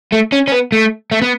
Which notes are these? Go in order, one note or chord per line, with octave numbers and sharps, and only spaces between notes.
A3
C#4
C#4
B3
A3
A3
B3